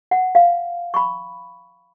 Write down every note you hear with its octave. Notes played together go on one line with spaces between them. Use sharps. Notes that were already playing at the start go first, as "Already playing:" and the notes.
F#5
F5
B5 C#6